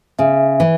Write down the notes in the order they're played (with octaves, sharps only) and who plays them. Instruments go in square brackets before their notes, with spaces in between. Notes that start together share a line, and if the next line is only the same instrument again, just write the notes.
[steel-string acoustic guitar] C#3 [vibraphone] E5
[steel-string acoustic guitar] E3